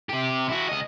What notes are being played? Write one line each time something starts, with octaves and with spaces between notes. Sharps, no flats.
C3 G4
E4 F#4
C#2 D#5